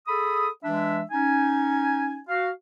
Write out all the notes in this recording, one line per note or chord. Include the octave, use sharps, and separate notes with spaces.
G#4 A4 B5 D#6
E3 G#3 D4 E5
C#4 D#4 G#5
F#4 F5